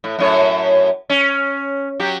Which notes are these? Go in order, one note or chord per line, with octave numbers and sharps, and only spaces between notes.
A2
F#2 A2 C#5
C#4
F#3 G4